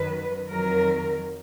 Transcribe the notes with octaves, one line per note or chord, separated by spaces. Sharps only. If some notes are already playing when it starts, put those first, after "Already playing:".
Already playing: F#2 D#3 F#3 B4
F2 D#3 F#3 A#4